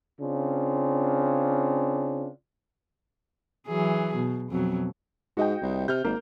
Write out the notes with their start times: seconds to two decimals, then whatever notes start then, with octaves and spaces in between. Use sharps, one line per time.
0.20 C#3 C4 D4 F4
3.68 E3 F#3 G#4
4.15 B2
4.50 F2 B2 F#3
5.37 G#2 F#4 D#5 G5
5.61 C2
5.88 C3 F6 G6
6.04 G#1 A#3